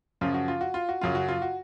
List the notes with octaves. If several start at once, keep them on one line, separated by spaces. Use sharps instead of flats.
F#2 C#3 F3 F4
F#4
F4
F#4
F4
F#4
F#2 C#3 F#3 F4
F#4
F4
F#4